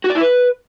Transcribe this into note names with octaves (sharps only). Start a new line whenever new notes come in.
F#4
D5
E4
B4